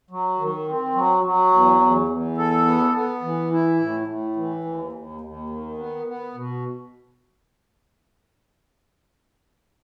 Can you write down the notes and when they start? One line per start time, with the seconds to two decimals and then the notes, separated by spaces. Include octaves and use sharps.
0.10 F#3
0.38 D#3
0.67 C4
0.94 F#3
1.24 F#3
1.52 E2
1.81 E2
2.09 E2
2.38 A4
2.65 B3
2.94 B3
3.22 E3
3.51 E4
3.80 A2
4.07 A2
4.36 E3
4.64 D#2
4.92 D#2
5.21 D#2
5.49 D#3
5.78 B3
6.06 B3
6.35 B2